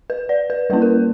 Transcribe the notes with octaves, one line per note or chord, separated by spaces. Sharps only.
B4
D5
B4
G3 A#3 C#4 E4 B4
A#4